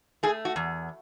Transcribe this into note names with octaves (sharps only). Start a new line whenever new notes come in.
A3 G#4
F#4
E2